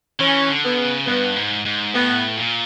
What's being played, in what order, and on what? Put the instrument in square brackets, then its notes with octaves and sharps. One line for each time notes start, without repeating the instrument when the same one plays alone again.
[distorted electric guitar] E3 [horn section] C#4
[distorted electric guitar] D3
[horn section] B3
[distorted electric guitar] C#3
[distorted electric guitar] G2 [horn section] B3
[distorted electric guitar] G#2
G#2
[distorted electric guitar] A2 [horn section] B3
[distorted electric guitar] A#2